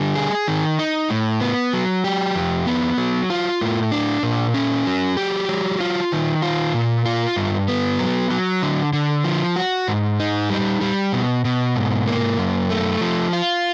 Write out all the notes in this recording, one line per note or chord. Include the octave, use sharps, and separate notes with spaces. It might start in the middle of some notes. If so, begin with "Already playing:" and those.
Already playing: D3 G3
G#4
D#3
D#4
A2
B3
F#3
G4
F2
B3
F#3
F4
A2
D4
A#2
C#4
F#3
G4
F#3
F4
D#3
F4
A#2
F4
G2
B3
F#3
F#3
D3
D3
F3
F#4
G#2
D#4
G3
G3
B2
B2
G#2
A#3
F#2
A3
F3
F4